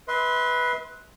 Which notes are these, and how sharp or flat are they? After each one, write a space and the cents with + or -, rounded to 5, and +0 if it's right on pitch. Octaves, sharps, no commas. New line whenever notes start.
B4 +0 E5 -40 C6 +0